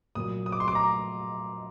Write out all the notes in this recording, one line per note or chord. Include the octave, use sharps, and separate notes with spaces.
A#2 F#3 D#6
D#6
D6
C6
D6
A#5